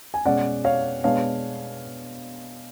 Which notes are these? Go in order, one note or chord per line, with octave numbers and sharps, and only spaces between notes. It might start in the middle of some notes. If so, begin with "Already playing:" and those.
G#5
B2 G#3 C#4 D5 F#5
C#5 F5
B2 G#3 B3 D4 C#5 F5